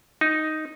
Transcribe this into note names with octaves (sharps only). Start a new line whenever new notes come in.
D#4